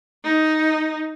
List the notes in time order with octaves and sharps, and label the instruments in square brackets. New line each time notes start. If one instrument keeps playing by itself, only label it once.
[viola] D#4